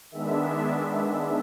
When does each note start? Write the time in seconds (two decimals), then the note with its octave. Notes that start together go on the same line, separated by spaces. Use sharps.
0.11 D#3 G#3 B3 D4 E5